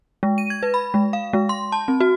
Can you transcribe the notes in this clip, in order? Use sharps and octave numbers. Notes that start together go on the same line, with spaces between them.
G#3
D#7
G#6
B4
B5
G#3
F5
G#3
C6
A5
C4
F#4